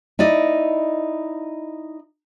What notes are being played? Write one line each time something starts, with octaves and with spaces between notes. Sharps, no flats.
D#4 E4 D5 D#5